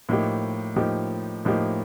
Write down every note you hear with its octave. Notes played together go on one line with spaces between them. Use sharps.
A2 F3 A#3 D#4 G4
A2 F3 A#3 D#4 G4
A2 F3 A#3 D#4 G4